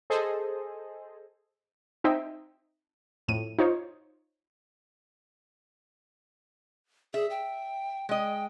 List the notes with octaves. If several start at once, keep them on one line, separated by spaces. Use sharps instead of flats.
G#4 A4 C5 D#5
C4 D#4 C5 D#5 E5 G5
F2 A2 D#7
D#4 F4 C5 C#5
G#4 E5
G5
G#3 D#5 G5